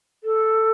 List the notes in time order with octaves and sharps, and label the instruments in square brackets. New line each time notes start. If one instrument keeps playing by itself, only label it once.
[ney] A4